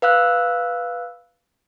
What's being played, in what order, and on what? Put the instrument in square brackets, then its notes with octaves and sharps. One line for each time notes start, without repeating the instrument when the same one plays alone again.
[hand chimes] B4 F5 E6 F#6